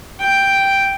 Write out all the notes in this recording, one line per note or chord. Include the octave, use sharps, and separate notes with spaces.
G5